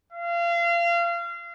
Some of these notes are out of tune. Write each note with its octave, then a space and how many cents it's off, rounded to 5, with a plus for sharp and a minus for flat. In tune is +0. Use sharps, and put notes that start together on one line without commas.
F5 -30